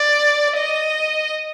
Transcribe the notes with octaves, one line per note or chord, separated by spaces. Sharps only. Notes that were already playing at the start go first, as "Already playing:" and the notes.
Already playing: D5
D#5